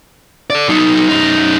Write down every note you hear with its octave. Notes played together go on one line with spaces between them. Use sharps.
A4 D5
F#3 D#4
F#2 D#4